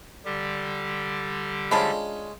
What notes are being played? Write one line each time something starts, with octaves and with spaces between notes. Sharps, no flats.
D3 G3 G4
F3 G#3 C#4 D4 B5